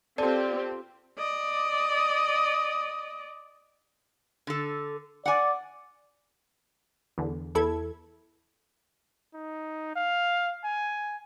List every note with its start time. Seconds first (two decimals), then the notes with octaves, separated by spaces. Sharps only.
0.18 C4 F4 G4 A4 D5
1.18 D5 D#5
4.47 D3 A4
5.26 D5 F#5 G#5
7.18 E2 D3
7.55 E2 E4 A4 G#6
9.34 D#4
9.96 F5
10.64 G#5